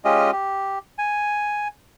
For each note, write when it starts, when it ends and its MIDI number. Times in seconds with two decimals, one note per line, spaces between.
0.05 0.31 56
0.05 0.31 61
0.05 0.31 65
0.05 0.31 67
0.05 0.31 75
0.32 0.79 67
0.98 1.68 80